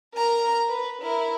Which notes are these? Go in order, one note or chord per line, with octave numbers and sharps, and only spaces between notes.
A#4 A#5
B4
E4 A#4